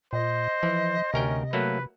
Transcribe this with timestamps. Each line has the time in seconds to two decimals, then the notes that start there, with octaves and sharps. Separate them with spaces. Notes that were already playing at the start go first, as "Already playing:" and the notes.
0.13 A#2 C5 D#5
0.63 E3 F3
1.14 D2 C3 C#4 A#4 G5
1.53 F#3 A3 A#3 B4